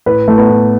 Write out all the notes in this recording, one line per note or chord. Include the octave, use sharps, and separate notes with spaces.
A2 B4
A2 A3
B3
A2